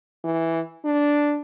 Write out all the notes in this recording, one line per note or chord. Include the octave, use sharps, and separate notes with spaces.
E3
D4